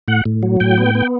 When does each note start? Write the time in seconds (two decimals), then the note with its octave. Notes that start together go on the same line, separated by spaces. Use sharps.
0.08 A2 F#5
0.26 A2
0.43 F#3
0.60 A2 G5
0.78 B3
0.95 B3